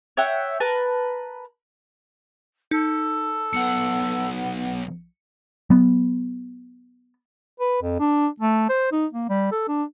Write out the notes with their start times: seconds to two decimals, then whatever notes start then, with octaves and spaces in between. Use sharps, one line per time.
0.17 C#5 E5 F#5 G5
0.60 A#4 B4 A5
2.71 D#4 A4
3.53 B1 B3 F#5 C#7
5.70 F#3 B3
7.60 B4
7.82 F2
8.00 D4
8.40 A3
8.69 C5
8.92 D#4
9.13 A#3
9.29 G3
9.52 A4
9.68 D4